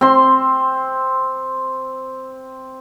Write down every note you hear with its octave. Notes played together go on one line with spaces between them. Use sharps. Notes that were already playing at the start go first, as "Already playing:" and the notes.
C4 C6